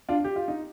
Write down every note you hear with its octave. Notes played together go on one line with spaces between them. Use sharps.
D4 F4
G4
F4
D#4